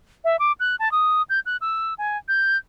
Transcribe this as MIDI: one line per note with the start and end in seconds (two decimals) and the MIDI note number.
0.24 0.37 76
0.39 0.52 86
0.60 0.76 90
0.79 0.92 81
0.92 1.22 87
1.30 1.40 91
1.46 1.57 90
1.61 1.94 88
1.98 2.18 80
2.28 2.57 91